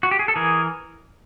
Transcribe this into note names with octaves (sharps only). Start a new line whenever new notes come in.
F#4
G4
G#4
A4
E3 G#4 A#4